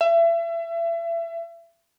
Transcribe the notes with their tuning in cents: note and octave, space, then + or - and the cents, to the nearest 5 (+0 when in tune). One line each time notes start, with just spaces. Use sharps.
E5 +30